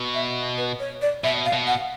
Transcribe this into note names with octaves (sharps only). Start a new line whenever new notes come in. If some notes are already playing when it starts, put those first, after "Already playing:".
Already playing: B2
E5
B4
C#5
D5
B2 E5
F5
B2
F#5